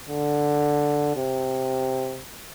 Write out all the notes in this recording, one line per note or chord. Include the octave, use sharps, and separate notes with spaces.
D3
C3